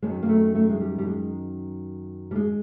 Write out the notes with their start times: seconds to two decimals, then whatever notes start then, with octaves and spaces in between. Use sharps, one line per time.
0.02 F#2 D#3 F#3 G#3
0.23 A#3
0.29 A3
0.55 A3
0.69 G#3
0.80 G3
0.98 G3
1.07 G#3
2.31 G3
2.36 G#3